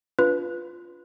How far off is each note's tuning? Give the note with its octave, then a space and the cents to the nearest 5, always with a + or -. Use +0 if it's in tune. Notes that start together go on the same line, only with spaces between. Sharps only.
D4 -20 F4 +0 B4 +0